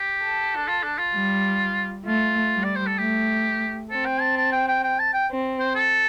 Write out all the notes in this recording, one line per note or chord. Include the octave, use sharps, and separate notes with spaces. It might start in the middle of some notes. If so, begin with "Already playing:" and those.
Already playing: G4
A4
D4
F4
D4
F4
G3
A3 F4
G3
D5
C5
A4
A3 G4
C4 A4
G5
A5
A5
G5
G5
G5
A5
G5
C4
C5
A4